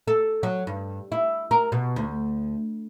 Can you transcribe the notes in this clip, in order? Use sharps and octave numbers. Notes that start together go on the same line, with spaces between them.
A4
F#3
G2
E4
A#4
B2
D2